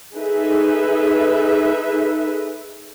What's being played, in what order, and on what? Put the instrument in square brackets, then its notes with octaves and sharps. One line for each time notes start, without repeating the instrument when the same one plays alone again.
[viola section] D#4 G#4 A4 B4 E5